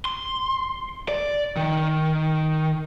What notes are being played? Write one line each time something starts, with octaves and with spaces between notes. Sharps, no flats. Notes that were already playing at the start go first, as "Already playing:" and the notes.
C6
D5
D#3